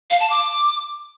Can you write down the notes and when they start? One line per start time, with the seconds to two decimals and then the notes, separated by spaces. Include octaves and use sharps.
0.11 F5
0.20 A5
0.30 D6